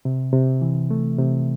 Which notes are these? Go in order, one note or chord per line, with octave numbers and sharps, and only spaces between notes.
C3
C3
E3
A3
C3